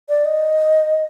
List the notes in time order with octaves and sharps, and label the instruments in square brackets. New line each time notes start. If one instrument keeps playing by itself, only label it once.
[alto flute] D5
D#5